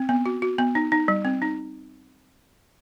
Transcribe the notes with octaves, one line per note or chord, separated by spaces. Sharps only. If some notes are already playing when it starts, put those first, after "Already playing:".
Already playing: C4
B3
F#4
F#4
B3
D#4
D#4
G3
C4
D#4